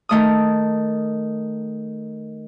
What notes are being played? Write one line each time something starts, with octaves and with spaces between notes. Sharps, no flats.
D#3 A3 D#6